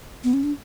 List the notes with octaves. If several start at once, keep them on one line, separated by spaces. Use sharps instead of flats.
B3
C#4
D4